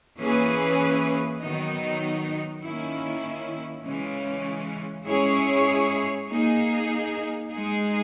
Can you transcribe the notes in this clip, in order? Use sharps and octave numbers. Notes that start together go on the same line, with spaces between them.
E3 A#3 C#4 G#4 B4
D#3 F#3 B3 D#4
D#3 A#3 C#4 E4
C#3 E3 G#3 C#4
G#3 C#4 E4 G#4 C#5
A#3 D#4 G#4
G#3 D#4 G#4